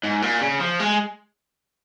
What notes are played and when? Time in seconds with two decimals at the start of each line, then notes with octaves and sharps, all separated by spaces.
0.03 G#2
0.22 A#2
0.41 C#3
0.60 F3
0.80 G#3